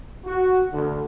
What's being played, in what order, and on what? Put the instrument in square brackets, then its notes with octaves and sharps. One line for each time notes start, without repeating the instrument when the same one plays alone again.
[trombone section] F#4
D2